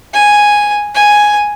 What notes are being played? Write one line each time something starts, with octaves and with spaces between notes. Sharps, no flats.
G#5
G#5